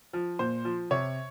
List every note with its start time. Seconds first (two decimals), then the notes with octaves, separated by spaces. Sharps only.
0.13 F3
0.39 A#2 C5
0.65 F3
0.91 C3 C#5